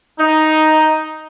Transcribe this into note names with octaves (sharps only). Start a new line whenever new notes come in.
D#4